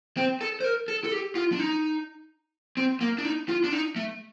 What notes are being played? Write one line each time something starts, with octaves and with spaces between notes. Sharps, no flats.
C4
A4
C5
A#4
A4
A4
G4
F4
D4
D#4
C4
A#3
D4
D#4
F4
D4
D#4
A3